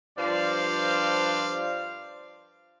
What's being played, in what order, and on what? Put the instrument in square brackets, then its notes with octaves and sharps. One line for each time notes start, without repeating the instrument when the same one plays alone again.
[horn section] G2 F3 C5 D5 F5